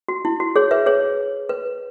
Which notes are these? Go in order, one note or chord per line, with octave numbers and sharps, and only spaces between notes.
F#4
E4
F#4
G#4 C#5
B4 E5
G#4 C#5
B4